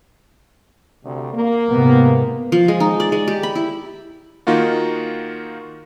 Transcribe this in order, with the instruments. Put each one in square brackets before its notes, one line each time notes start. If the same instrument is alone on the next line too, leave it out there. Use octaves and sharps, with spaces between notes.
[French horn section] D2 C3
A#3
[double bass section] G#2 C3 B3
[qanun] F3
G#3
D#4
D5
G#3
G4
B5
E4
[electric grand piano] D#3 A#3 D#4 F4 F#4